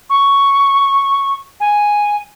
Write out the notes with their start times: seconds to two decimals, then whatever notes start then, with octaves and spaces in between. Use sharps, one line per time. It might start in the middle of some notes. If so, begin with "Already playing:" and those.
0.10 C#6
1.60 G#5